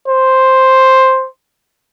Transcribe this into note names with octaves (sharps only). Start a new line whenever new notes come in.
C5